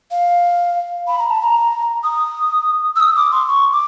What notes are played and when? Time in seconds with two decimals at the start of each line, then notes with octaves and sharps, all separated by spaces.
0.11 F5
1.08 B5
1.19 A#5
1.30 A5
1.41 A#5
2.04 D#6
2.96 E6
3.00 D#6
3.16 D6
3.32 C6
3.48 C#6
3.72 D6